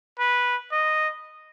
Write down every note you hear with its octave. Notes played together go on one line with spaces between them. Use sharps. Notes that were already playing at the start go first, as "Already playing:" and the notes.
B4
D#5